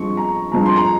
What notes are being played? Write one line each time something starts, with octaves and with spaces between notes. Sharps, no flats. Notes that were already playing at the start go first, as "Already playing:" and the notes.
Already playing: G2 F3 G#3 C4 C#6
A#5
G2 F3 G#3 C4 A#5
C6
A#5